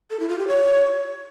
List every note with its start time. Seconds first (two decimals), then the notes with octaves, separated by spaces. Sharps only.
0.10 A4
0.20 E4
0.29 F4
0.38 G4
0.47 C#5